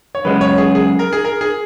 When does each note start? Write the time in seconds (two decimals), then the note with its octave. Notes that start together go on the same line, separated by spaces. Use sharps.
0.15 C#5
0.25 F#2 C#3 G#3 B3 B4
0.41 C#5
0.58 G#4
0.75 G#4
0.99 A#4
1.13 G#4
1.25 A#4
1.41 G#4